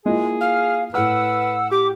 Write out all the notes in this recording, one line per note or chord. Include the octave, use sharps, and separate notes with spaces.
G#3 A#3 E4 F4 G#4
F5 F6
A2 B4 F#5 E6 F6
G4 D6